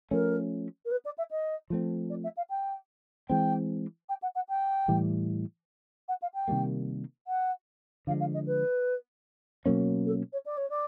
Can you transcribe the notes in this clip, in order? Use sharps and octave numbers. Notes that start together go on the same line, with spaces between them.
F3 A3 C#4 A#4
A#4
B4
D5
E5
D#5
F3 A3 C4
D5
E5
F5
G5
E3 G#3 C4 G5
G5
F#5
F#5
G5
A2 E3 G3
F#5
F5
G5
C3 D#3 G3 A#3
F#5
D3 F3 G#3 F5
F5
D#5
B4
B2 F#3 A#3 C#4
A4
C#5
D5
C#5
D5